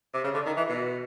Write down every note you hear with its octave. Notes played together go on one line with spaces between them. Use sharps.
C3
C#3
D3
D#3
E3
B2